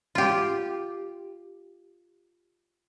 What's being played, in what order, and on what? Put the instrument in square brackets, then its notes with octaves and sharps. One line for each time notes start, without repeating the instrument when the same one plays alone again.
[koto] F4 G4